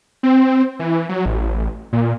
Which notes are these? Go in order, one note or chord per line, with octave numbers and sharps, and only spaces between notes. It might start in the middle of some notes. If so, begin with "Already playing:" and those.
C4
E3
F#3
A1
A#2